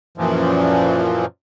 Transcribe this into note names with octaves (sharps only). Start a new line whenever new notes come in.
F#2 A#2 E3 F3